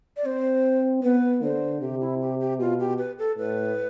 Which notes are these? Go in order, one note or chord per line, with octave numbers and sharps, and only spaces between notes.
D5
C4 C5
B3 B4
D3 C5
C3 G4
E4
G4
G4
B2 F4
G4
B4
A4
A2 B4